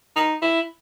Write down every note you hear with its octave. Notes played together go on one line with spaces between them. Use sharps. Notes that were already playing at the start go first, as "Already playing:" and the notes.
D#4
E4